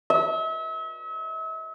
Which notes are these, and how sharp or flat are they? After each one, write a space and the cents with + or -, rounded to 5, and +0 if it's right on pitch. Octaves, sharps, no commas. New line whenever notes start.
E5 -40